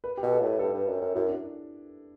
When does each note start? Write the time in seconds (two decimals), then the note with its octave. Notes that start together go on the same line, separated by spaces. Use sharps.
0.04 B4
0.17 G4
0.23 B2
0.32 A4
0.41 A2 B4
0.59 G2 A4
0.74 G2
0.87 F#2
1.01 F#2
1.15 F#2 E4
1.29 D4